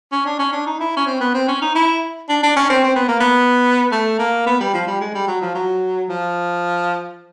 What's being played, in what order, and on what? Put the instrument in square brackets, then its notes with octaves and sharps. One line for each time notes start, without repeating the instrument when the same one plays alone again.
[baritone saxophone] C#4
D4
C#4
D4
D#4
E4
C#4
C4
B3
C4
C#4
D#4
E4
D4
D4
C#4
C4
C4
B3
A#3
B3
A3
A#3
B3
G3
F3
G3
G#3
G3
F#3
F3
F#3
F3